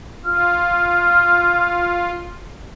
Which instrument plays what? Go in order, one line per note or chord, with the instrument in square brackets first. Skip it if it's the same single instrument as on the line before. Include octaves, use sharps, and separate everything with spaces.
[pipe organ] F4 [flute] F6